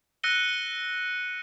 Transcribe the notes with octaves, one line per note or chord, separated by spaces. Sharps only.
E6 F#6 A#6 C#7 D#7 G7